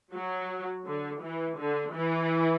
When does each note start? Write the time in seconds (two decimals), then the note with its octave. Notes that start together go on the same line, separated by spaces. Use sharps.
0.13 F#3
0.86 D3
1.22 E3
1.58 D3
1.95 E3